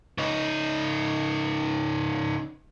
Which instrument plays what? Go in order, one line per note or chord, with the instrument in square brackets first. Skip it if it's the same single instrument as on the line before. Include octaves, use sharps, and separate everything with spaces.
[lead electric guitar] C#3 D#4